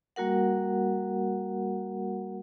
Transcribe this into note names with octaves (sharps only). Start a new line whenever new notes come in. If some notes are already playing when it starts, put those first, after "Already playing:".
G3 A#3 F#4 A#4 F#5